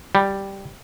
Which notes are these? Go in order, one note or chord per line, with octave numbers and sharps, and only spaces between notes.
G3